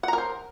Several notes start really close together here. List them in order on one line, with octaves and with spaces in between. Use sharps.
F#5 A#5 A#4 C5